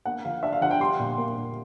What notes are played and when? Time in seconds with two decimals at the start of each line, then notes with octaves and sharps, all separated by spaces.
0.06 A#3 F#5
0.25 F3 F5
0.43 D4 E5
0.52 F5
0.61 F3 F#5
0.71 G5
0.80 G3 C6
0.99 A#2
1.18 A#3
1.36 A#2